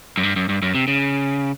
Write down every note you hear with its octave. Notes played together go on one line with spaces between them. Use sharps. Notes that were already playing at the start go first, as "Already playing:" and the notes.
F#2
G2
F#2
G2
F#2
C3
C#3